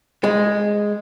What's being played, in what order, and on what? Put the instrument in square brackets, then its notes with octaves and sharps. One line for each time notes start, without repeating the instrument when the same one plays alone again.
[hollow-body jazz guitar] G#3